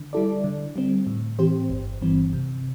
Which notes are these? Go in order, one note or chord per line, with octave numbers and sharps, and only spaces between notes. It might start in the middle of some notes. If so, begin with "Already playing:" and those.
Already playing: D3
G3 E4 A4 D5
D3
G3 C4
A2
E3 C4 G4 C5
G1
G2 E3 C4
C3